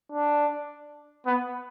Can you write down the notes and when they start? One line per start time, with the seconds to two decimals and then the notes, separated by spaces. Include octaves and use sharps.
0.12 D4
1.26 B3